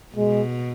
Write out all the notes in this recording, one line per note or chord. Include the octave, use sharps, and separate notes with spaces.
B2 G#3